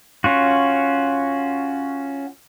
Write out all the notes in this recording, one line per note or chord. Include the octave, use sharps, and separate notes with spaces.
C#4 F4 F#4